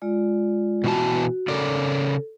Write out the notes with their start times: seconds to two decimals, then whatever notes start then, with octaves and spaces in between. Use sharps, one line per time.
0.02 G#3 F4 D5
0.84 B2 E3 F#4 A5
1.48 C#3 A4 A#4 D5